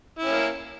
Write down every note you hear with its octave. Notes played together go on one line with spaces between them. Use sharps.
A#3 C#4 E4